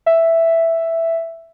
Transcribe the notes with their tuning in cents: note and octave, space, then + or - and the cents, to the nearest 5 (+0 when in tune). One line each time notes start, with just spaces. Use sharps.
E5 +0